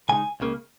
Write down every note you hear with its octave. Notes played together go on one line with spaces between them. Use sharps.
C#3 G#3 D#4 G#5
C#2 C#3 A#3